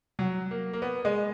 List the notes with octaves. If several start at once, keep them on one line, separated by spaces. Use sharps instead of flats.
F#3
A#3
A#3
B3
G#3